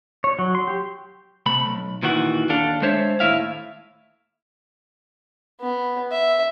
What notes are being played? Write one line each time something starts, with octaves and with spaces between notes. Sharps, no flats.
C#5
F#3
C6
G4
C3 A3 B5
B1
A#2 D#3 E3 F#4
D#2 D4 A4 F5
G#3 D4 C5 C#5 E5
D#2 A2 E4 E5 F5
B3
E5